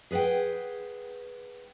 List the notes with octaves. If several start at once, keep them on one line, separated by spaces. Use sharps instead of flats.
G#4 B4 D5 F#5 G5